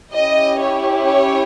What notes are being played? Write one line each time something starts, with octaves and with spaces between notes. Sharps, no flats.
C#4 E4 G4 D#5
C#5
C#5